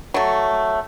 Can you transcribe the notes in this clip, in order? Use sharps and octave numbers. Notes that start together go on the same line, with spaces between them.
F#3 A3